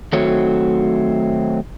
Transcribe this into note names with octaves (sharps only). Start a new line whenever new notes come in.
D#3 F#3 A3 C4 F#4 C#5